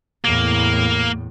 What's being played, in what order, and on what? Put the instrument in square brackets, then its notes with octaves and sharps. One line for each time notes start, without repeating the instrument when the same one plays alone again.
[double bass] E2 A2 [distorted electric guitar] A#3